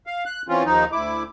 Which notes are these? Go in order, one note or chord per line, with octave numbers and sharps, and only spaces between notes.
F5
F#6
E3 C4 C#4 F4
D#2 F3 D#4
D2 E4 D6